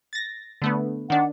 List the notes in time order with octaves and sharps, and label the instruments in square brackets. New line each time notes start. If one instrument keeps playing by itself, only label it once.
[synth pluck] A6 A#6
D3 A3 B3
[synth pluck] D#3 D4 [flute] F#5